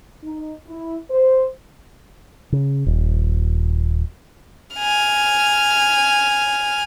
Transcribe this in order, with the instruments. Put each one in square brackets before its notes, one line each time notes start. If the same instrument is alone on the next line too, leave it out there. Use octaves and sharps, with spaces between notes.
[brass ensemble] D#4
E4
C5
[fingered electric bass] C#3
D#1
[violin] G#5 F6